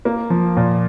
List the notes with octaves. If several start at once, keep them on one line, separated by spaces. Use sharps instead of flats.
A#3
F3
A#2